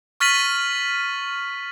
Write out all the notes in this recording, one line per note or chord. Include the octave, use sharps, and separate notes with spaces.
C#6 F6 A6 B6 D#7 F#7